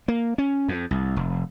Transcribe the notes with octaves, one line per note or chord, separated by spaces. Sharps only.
A#3
C#4
F2
C2
F1